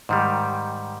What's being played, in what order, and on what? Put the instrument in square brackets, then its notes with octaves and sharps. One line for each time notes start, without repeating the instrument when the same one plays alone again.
[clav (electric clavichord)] G#2 D#3 G3